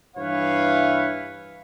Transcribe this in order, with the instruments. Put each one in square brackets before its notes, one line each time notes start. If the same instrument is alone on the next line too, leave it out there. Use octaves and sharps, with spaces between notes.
[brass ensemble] G2 E3 E4 B4 C#5 F5